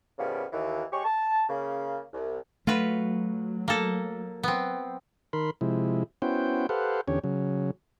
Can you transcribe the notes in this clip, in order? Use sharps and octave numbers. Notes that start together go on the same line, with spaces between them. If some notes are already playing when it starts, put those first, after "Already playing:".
A2 C#3 F3 G3 A#3 B3
D#2 D#3 E3
G#3 G4 G#4 C#5 C#6
A5
C#3 A#3
C2
F#3 A3 F4 F#4 B4
A#3 A4
B3 C4
D#3 A#4 B5 C6
C3 F3 G#3 E4
B3 C#4 E4 F#4 C5 G5
G4 A4 B4 C5 F5 F#5
E2 D3 C#4 G4 C#5
C#3 F#3